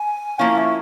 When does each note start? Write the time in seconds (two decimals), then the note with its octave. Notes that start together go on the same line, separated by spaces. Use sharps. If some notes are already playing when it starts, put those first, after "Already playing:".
Already playing: G#5
0.39 F3 A#3 C#4 E4 F5
0.58 E5